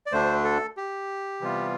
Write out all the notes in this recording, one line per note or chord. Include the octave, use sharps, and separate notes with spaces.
D5
D2 D3 A3 D4 C5
A4
G4
C3 E3 G3 B3 F4